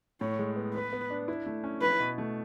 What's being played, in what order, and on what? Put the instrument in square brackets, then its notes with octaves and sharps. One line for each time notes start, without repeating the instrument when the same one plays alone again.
[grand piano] A2 [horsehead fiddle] C#5
[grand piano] G#3
B3
[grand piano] B3 [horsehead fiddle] B4
[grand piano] B3
D4
E4
A3
C#4
[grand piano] E4 [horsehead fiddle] B4
[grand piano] B2
A3